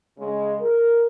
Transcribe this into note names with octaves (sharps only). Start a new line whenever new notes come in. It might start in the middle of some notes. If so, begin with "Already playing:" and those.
C#3 G#3
A#4